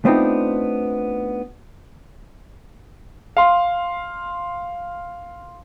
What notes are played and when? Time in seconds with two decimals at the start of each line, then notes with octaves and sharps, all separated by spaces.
0.05 A3 B3 C4 D4 D#4 F4
3.37 F5 C6